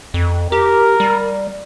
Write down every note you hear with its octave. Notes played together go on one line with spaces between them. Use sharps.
F2
G4 A#4
G3